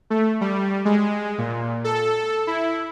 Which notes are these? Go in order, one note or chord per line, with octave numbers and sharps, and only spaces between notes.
A3
G3
G#3
A#2
A4
E4